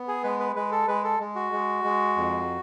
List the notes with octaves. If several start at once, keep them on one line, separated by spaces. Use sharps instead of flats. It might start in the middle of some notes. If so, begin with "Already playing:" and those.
Already playing: B3
G#4
G#3 B4
B4
G#3 B4
A4
G#3 B4
A4
G#3
F#4
G#3
G#3
F2